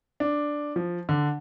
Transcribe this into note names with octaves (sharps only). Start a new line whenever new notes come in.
D4
F3
D3